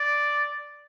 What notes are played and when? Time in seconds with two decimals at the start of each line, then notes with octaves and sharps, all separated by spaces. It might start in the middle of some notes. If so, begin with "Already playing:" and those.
Already playing: D5